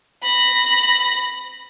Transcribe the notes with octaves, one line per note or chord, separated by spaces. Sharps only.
B5 A#6